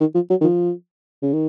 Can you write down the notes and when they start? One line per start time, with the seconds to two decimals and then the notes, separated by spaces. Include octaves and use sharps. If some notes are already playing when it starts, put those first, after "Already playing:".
0.01 D#3
0.15 F3
0.30 F#3
0.41 D#3
0.44 F3
1.23 C#3
1.33 D#3